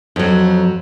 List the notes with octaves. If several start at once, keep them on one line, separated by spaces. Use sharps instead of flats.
F2 F#3